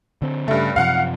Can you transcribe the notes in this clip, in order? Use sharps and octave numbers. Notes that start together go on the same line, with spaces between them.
D3 C4
G2 C#3 A3
F#2 C3 F3 F5 F#5